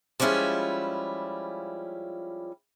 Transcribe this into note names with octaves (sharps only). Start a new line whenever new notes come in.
F3 G3 G#3 C#4 E4 F4